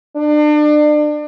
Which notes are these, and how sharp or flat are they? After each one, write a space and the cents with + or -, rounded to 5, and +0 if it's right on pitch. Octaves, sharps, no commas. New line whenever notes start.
D4 +35